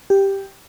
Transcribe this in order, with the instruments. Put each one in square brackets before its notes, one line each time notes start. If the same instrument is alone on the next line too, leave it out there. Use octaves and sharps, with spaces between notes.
[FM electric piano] G4